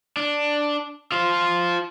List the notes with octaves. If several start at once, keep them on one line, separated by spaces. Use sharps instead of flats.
D4
F4 C5